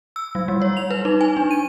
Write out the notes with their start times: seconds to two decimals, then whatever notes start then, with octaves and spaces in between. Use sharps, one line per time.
0.16 E6
0.35 F#3
0.48 G3
0.62 C#5
0.77 F7
0.90 B4
1.05 D#4
1.21 G#5
1.37 D4
1.51 D#7